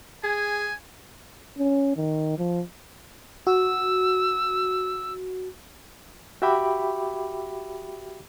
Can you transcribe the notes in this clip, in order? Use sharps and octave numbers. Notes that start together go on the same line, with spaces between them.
G#4 G#5
C#4
D#3
F3
F#4 E6
F#4 G4 E5 G5 B5 D6